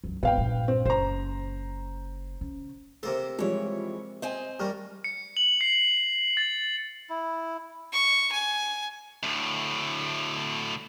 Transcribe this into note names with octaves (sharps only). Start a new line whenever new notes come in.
C#2 F#2
G#1 B3 B4 F5 G5
A#1 G2
C4
F#1 C5 A#5
C#3
C3 A#3 A4 C5
E3 F3 G3 G#3 C#5
C4 C5 D#5 G#5
G3 A#3 C#6 F6
C#7
F#7
C7
A6
E4
C#6
G#5
D2 A2